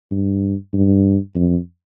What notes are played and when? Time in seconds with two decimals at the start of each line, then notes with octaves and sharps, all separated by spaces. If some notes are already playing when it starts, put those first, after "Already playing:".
0.11 G2
0.73 G2
1.35 F2